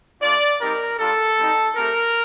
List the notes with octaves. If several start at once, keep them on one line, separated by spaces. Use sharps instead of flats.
A3 D4 F4 D5
G3 C4 D#4 G4 A#4
G3 D4 F4 A4
G3 C4 D#4
A3 C4 G4 A#4